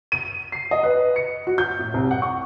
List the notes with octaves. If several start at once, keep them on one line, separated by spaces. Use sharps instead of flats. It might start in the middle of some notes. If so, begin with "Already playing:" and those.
D#7
C7
D#5
B4
C#7
F#4
G6
A2
C2
F#5
C#6